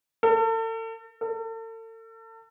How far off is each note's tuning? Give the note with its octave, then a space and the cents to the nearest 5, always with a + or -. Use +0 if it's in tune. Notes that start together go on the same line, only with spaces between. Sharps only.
A4 +40
A4 +40